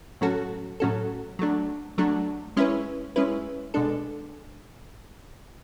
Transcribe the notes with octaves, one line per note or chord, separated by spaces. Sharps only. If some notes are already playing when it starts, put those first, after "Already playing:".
A2 F#3 C#4 F#4 A4
A2 F#3 C#4 F#4 A4
F#3 A3 D4
F#3 A3 D4
G#3 C#4 E4 B4
G#3 C#4 E4 B4
B2 G#3 D4 A4